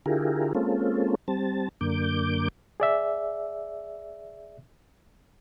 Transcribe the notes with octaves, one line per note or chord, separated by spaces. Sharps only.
D3 E4 F4 G4 G#4 A#4
G#3 A#3 C4 C#4 F4 A4
G3 C4 A5
F#2 D3 A#3 D6 G6
G#4 D5 E5